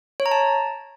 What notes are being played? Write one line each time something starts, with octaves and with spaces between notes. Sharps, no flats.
C#5
A#5
A5